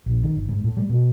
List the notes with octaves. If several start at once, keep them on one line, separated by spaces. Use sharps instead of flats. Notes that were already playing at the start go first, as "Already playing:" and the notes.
A#1
D#3
G1
G#2
A2
G3
B2